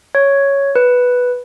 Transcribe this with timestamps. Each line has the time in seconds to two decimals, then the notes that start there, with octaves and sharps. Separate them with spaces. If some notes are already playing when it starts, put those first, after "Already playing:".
0.15 C#5
0.76 B4